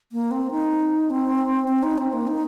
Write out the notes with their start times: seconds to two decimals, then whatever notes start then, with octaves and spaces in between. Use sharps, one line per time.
0.12 A#3
0.31 C4
0.51 D#4
1.10 C4
1.68 C4
1.83 D#4
1.98 C4
2.13 A#3
2.27 D#4